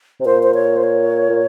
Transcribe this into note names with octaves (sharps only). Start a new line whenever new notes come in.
C3
A#2 C5
C5
C#5
C5
C#5
A#2